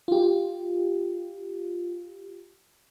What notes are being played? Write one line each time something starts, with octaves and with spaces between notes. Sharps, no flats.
F4 G4